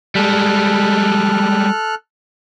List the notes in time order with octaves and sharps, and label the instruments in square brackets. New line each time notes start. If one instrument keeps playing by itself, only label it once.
[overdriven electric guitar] G3 G#3 [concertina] A4 F6 F#6